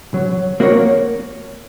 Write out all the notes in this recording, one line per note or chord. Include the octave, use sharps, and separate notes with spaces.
F#3
A#3 F#4 A#4 C#5